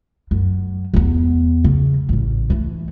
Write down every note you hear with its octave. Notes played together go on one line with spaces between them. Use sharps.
F#2
E2 B3
C#3
A1 C#3
E3 A3